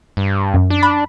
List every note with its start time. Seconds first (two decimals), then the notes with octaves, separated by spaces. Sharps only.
0.17 G2
0.54 F#2
0.70 D4
0.83 B5